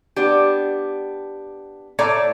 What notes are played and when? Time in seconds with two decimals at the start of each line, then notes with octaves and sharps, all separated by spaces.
0.16 B3 D4 G4
1.99 A2 A4 C#5 D5 A#5